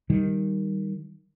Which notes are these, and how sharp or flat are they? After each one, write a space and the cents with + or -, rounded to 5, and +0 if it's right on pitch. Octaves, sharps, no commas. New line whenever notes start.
D#3 +0 G3 +0